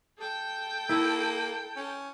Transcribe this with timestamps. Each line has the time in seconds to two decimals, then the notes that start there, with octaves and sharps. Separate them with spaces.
0.18 A4 G5
0.89 A#3 E4
1.76 C#4